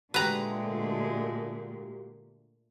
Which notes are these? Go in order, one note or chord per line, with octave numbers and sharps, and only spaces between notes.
A#2 D3 G#3 A3 F#4 G4 B4 A#5